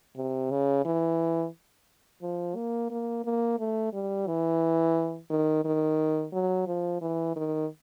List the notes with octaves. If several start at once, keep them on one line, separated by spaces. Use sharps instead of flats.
C3
C#3
E3
F3
A#3
A#3
A#3
A3
G3
E3
D#3
D#3
F#3
F3
E3
D#3